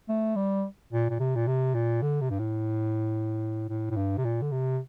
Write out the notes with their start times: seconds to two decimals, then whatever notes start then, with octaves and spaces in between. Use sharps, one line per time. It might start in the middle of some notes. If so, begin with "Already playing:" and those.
0.09 A3
0.36 G3
0.93 A#2
1.10 A#2
1.20 C3
1.36 A#2
1.47 C3
1.74 A#2
2.02 D3
2.21 C3
2.30 G2
2.39 A2
3.69 A2
3.91 A2
3.97 G2
4.17 C3
4.25 A#2
4.42 D3
4.52 C3